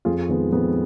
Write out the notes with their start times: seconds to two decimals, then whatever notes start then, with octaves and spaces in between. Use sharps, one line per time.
0.05 F2 F4 G#4
0.29 D#3 G#3 B3
0.52 F2 B3